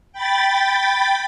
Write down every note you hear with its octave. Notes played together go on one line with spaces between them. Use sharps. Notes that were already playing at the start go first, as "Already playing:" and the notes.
G5 B5 A6